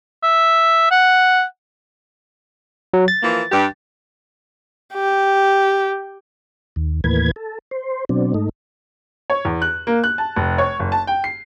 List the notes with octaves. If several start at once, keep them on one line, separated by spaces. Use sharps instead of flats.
E5
F#5
F#3
A6
E3 F3 A#3
G2 G4
G4
D#2
D#2 A2 E3 A#3 B4 G#6
A4
C5
B2 F#3 C4 D4
G#2 A3 D#4
C#5
E2
F#6
A#3
F#6
A5
F1
C#5
F#1
A5
G5
C7